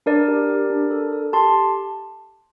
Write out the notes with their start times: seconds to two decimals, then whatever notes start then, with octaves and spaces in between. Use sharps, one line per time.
0.06 D4 A#4 D5
0.28 G4
0.49 G4
0.70 D4
0.91 A4
1.12 A4
1.33 G4 A5 C6